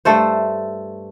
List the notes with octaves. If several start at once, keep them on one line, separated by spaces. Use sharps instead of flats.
G2 A3 A4 C5